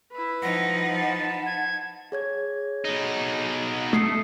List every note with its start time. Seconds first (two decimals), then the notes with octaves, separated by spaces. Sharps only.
0.12 E4 B4
0.42 F3 D#4 F#5 A#6
0.96 A5 B5 A6
1.46 G#6
2.12 G#4 C#5 G#6
2.84 B2 D#4
3.93 A3 D#6 C7 C#7